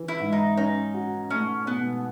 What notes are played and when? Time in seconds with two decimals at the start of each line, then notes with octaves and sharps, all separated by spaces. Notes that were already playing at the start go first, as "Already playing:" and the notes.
Already playing: E3
0.08 E4
0.20 G#2
0.32 D#4
0.57 C#4 D#4
0.94 F#4
1.30 A3 C#4
1.67 B2 B3